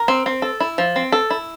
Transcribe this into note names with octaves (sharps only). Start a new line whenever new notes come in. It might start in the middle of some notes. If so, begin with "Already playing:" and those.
Already playing: A#4
C4
C4
A4
E4
F3
C4
A4
E4